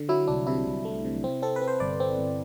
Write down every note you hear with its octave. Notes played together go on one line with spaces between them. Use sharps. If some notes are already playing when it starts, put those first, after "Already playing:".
Already playing: D3
F#3 E4
C2 D4
C3 E4
C2
A3
C3
C4
C4 A4
B4
C4
C5
G1 D5
C4
G1